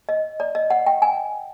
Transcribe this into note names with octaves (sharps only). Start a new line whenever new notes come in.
D#5
D5
D#5
F#5
G5
G#5